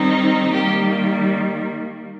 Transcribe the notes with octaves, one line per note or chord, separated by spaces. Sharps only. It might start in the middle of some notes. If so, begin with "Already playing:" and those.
Already playing: D#3 G3 C4 D#4
D#3 G3 A#3 G4